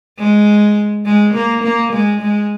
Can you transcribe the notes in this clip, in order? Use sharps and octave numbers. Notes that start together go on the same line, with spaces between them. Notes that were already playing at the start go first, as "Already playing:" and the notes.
G#3
G#3
A#3
A#3
G#3
G#3